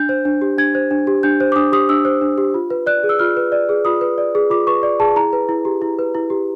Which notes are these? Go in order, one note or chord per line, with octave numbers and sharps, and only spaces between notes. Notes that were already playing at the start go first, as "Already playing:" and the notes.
Already playing: D4 G6
C5
D4
G4
D4 G#6
C5
D4
G4
D4 G6
C5
D6
D4 D#6
G4 D#6
D4 E6
C5
D4
G4
F4
B4
D5 F#6
G#4
E6
F4 F6
B4
D5
G#4
F4 D#6
B4
D5
G#4
F4 D6
B4 C#6
D5
G#4 A5
E4 A#5
B4
E4
G4
E4
B4
E4
G4